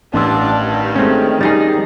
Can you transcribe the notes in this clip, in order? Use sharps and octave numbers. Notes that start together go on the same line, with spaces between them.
A1 G2 D4 C6 E6
D#3
G#3 A3 C4 C#4
G3 D#4 G#4 A6 A#6